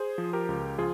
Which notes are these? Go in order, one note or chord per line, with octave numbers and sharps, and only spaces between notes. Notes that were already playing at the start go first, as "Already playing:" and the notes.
Already playing: G#4 C5
F3
G4 A#4
C#2
F3 F4 G#4